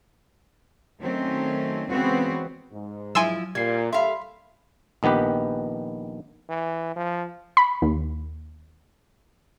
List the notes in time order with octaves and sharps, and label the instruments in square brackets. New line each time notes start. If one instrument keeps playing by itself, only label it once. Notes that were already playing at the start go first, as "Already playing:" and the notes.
[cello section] D#3 F#3 A3 C4 C#4
C#3 E3 G#3 B3 C4 F#4
[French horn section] G#2
[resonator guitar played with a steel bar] F3 E4 [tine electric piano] F#3 [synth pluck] G#5 C6 E6
[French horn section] A#2 [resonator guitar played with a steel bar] G3 [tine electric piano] G#6 C7
[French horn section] G3 A4 [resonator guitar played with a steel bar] E5 F5 [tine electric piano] B5 C6
[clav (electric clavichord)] A#1 D#3 B3 G4 B4
[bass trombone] E3
F3
[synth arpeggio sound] B5
D#2